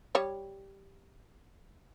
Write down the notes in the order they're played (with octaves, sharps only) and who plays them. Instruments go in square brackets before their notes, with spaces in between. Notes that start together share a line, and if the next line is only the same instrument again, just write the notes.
[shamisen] G3 C#5